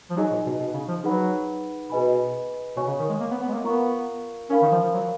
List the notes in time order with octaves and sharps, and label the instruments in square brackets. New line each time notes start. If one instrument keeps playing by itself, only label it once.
[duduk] F3
[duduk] F#3 [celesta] D#4 G#4 D#5 G#5
[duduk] A#2
B2
B2
C#3
F3
[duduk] F#3 [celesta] D#4 G#4 B4 F#5 B5
[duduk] B2 [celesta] G#4 B4 D#5 G#5 B5
[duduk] B2 [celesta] C#5 G#5 C#6
[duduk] C#3
D#3
G#3
A#3
B3
B3
G#3
A#3
[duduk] B3 [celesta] F4 A#4 F5 A#5 C#6
[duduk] C#4 [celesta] A#4 F5 B5
[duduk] D#3
F3
F3
F#3